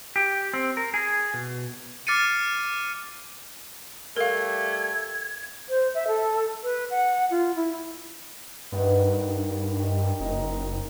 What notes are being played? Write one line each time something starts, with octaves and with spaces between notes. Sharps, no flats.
G4
C4
A#4
G#4
B2
D6 F6 A6 C7 C#7 D#7
G3 A3 A#4 F5 G#6
C5
E5
A4
B4
F#5
F4
E4
G2 D#3 B3
D#3 G4
F#1 D#4